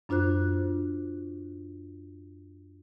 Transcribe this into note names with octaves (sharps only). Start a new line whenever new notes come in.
F#2 D4 F4 C5 F#6